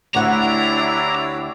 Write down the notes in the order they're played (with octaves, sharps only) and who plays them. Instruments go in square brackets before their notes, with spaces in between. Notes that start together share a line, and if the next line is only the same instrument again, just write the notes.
[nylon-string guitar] D2 F#5 [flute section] D4 E4 [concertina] G4 C#5 [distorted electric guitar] A#5